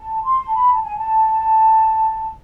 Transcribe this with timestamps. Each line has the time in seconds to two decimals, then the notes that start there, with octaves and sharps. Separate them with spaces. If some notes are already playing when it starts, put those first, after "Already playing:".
Already playing: A5
0.23 C6
0.47 A5
0.54 B5
0.68 A5
0.83 G#5
0.97 A5